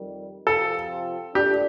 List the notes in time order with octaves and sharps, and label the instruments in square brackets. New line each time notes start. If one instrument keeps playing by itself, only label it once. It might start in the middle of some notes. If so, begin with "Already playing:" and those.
Already playing: [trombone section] F2 D#3 G3
[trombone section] C3 F3 C4 F4 [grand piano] A4
[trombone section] A#2 A3 D4 [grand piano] G4